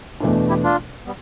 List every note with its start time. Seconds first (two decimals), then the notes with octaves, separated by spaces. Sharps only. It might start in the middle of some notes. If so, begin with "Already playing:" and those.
0.20 E2 B2 A3 D4
0.49 E4 G4
0.63 D4 F4
1.06 G3 B3